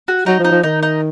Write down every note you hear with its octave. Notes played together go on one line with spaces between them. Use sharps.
F#4
F#3 D#4
F3
D#4
F3
D#3 D#4
D#4